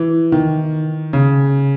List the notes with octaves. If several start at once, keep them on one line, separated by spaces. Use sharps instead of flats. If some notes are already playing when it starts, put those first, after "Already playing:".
Already playing: E3
D#3
C#3